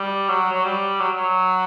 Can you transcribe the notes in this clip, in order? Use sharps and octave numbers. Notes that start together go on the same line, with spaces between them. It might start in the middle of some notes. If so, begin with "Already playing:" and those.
Already playing: G3
F#3
F#3
G3
F#3
F#3